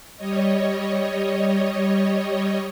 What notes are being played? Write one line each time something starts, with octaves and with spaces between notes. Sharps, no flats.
G3 C#5 D#5